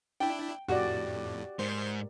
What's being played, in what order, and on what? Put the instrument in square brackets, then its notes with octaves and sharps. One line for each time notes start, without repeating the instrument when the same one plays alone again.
[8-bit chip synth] D4 E4 [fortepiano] G5
[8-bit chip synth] F2 A2 [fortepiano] F#4 [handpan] G4 D5
[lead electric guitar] G#2 [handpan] A#4 [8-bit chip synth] C5 C6